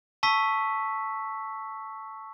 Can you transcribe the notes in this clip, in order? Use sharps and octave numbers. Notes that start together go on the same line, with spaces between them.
A5 C#6 E6 B6